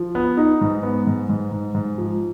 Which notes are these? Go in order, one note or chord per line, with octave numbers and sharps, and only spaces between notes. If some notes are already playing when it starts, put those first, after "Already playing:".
Already playing: F3
B3
D#4
G#2
B3
G#2
G#2
G#2
G#2
F3